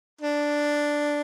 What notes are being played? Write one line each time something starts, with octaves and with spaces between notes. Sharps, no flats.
D4